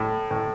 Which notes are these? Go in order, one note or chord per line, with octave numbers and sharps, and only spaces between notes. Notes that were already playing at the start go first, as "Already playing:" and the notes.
Already playing: A2
A2